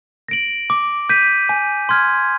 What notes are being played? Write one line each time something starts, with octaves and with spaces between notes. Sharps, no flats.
A#6 D7 F#7
D6
G6 B6 D#7
G#5
C6 F6 G#6